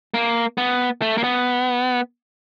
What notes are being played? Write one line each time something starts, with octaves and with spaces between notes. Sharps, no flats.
A#3
B3
A3
A#3
B3